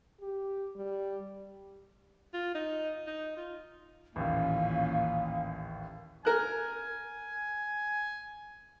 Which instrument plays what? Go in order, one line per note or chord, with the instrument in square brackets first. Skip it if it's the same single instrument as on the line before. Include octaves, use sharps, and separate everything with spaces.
[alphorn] G4
G3
[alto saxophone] F4
D#4
D#4
F4
[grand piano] A1 D#2 [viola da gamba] A#2 E3 C#4 [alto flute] F5
[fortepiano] A#4 F#6 [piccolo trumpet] G#5